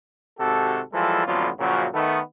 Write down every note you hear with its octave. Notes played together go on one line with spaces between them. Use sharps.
G#1 C3 F#4 G4 A4
E3 F3 G3 G#3 F4 A4
A1 F2 D3 F#3 B3 F4
F#2 A#2 C#3 F3 F#3
D#3 A3 B3